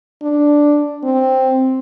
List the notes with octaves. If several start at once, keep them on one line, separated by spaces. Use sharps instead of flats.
D4
C4